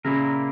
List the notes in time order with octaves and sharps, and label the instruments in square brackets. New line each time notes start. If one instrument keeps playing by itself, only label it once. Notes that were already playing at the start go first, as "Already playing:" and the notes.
[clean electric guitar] A#2 A#3 E4 A#4 [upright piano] C#3